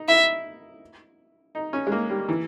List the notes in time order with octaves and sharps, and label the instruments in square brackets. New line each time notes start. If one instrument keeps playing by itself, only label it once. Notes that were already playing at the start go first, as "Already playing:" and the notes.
Already playing: [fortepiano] D#4
[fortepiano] E4 [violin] E5
[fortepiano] D#4
C#4
G#3
A#3
G3
E3